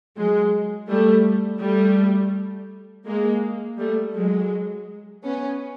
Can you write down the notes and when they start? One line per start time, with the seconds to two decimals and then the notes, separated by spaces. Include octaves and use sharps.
0.17 F#3 G#3
0.88 G3 A3
1.61 G3 A3
3.06 G#3 A#3
3.79 G3 A3
4.14 F#3 G#3
5.24 B3 C#4